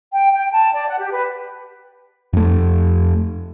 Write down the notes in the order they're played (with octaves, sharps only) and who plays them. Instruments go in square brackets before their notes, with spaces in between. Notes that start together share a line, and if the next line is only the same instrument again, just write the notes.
[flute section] G5
G5
A5
D5
F#5
G4
B4
[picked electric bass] F2 A3